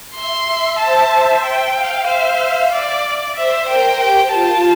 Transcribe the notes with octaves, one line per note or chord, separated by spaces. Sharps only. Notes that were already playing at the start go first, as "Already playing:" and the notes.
E5 C6
E5
C5 A5
E5
G5
F5
C5 E5
D5
C5 E5
A#4 G5
G4 G5
F4 A5